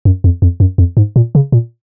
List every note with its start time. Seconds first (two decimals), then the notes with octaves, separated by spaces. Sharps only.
0.05 F#2
0.24 F2
0.42 F2
0.60 F#2
0.78 F2
0.97 G#2
1.16 A#2
1.35 C#3
1.52 A#2